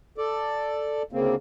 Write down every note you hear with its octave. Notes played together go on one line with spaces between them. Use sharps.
A4 D5
D2 C#3 A#3 C4